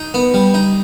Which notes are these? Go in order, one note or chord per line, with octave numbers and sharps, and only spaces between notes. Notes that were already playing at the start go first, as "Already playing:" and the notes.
Already playing: D#4
B3
G3
D#4